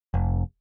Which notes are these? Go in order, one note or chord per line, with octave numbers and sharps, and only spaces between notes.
F1